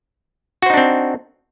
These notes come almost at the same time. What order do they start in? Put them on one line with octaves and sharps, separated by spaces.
F#4 C5 D#4 D4 C4